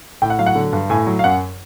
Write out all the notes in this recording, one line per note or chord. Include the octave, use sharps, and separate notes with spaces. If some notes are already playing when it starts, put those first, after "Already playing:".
A2 G5
F#5
F#3 F5
F#5
D3
G2
A2 G#5
F#3
F5
F#2 F#5